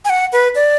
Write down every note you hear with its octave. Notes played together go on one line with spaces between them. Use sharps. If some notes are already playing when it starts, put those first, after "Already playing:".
G#5
F#5
B4
D5